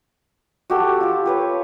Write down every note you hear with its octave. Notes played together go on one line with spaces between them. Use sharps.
F#4 G4 A4
F4 G4
G4 B4 C#5